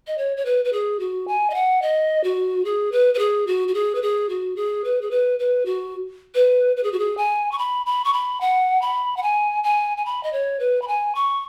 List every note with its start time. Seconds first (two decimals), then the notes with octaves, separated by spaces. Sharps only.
0.07 D#5
0.18 C#5
0.37 C#5
0.45 B4
0.65 B4
0.73 G#4
1.00 F#4
1.28 G#5
1.50 D#5
1.54 F#5
1.82 D#5
2.24 F#4
2.65 G#4
2.92 B4
3.14 B4
3.19 G#4
3.47 F#4
3.68 F#4
3.74 G#4
3.95 B4
4.02 G#4
4.29 F#4
4.56 G#4
4.84 B4
5.02 G#4
5.11 B4
5.39 B4
5.66 F#4
6.35 B4
6.77 B4
6.83 G#4
6.92 F#4
6.99 G#4
7.17 G#5
7.52 C#6
7.59 B5
7.86 B5
8.04 C#6
8.13 B5
8.41 F#5
8.82 B5
9.17 F#5
9.23 G#5
9.64 G#5
9.97 G#5
10.06 B5
10.23 D#5
10.33 C#5
10.60 B4
10.82 B5
10.88 G#5
11.15 C#6